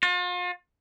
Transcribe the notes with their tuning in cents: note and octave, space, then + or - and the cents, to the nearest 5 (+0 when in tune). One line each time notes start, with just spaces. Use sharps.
F4 +40